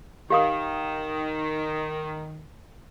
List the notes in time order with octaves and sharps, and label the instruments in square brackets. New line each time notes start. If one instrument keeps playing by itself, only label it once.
[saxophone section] D#3 [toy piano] G4 F5 D#6